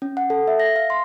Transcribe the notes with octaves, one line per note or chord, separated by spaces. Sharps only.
C#4
F#5
A4
E5
A#6
F5
C6